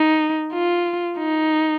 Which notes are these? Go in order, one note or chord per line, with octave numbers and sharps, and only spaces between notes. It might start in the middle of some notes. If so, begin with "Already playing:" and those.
Already playing: D#4
F4
D#4